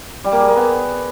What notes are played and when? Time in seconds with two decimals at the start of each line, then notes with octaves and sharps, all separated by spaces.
0.24 G3
0.32 A#3
0.40 G#4
0.48 A#3
0.56 B3